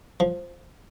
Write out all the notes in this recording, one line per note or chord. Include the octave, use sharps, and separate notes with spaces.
F3